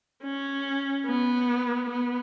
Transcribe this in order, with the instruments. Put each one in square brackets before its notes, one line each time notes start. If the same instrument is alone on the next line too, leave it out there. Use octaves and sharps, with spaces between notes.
[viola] C#4
B3
B3